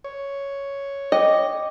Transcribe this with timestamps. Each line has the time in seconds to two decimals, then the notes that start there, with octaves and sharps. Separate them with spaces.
0.04 C#5
1.12 D#5 G5 D6